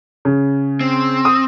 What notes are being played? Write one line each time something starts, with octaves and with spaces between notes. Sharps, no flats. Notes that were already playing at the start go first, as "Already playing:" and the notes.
C#3
C4
D#6